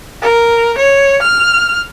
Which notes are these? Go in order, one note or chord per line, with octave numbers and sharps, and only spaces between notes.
A#4
C#5
F6